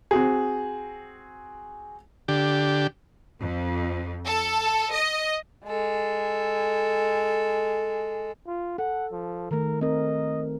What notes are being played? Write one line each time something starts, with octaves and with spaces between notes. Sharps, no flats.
C4 F#4 G#4
D3 G4
F2
A4
D#5
G#3 A4
F4
A4 F#5
F3
D#3 A3 A#4
C4 A#4 D#5